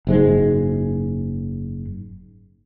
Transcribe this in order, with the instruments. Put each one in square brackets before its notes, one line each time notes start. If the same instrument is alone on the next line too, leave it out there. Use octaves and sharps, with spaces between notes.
[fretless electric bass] F#1 G#2 G#3